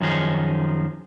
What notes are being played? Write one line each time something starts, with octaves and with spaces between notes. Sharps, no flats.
F#2 D#3 F3 D#4 G#4